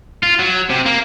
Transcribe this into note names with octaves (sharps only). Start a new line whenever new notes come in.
F4
F#3
C3
A#3